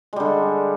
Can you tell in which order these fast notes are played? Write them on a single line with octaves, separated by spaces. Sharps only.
G#3 G3 D3